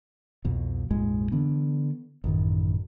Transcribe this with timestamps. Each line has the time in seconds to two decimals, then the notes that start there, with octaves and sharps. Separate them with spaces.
0.45 C2 F2 B2
0.91 A#1 F2 G#2 G#3
1.32 D3 E3 B3 D4
2.24 A1 F#2 D#3